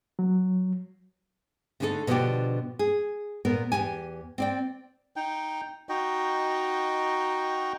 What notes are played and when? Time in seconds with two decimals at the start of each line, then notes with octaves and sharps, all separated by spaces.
0.19 F#3
1.80 D3 A3 D4 D#4 G#4 A4
2.07 B2 D3 F3 D4 F#4 G4
2.79 G#4
3.45 A#2 B3 A#4
3.72 E2 A#2 G4 G#5
4.38 C4 D5 G5
5.16 D#4 G5
5.89 D#4 F#4 D#5 G5